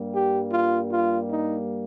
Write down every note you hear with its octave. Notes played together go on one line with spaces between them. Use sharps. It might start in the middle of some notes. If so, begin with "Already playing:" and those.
Already playing: G2 G3 A#3
G4
F4
F4
D#4